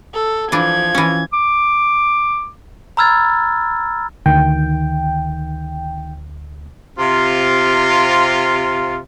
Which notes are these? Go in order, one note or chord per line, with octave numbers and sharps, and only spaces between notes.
A4
E3 F3 D4 G#6
E3 C#4
D6
A#5 B5 E6 F6 G#6 A6
D2 D#3 G5
C3 F4